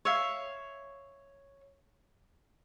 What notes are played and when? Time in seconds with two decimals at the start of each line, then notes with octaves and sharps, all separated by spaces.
0.05 C#5 E5 F5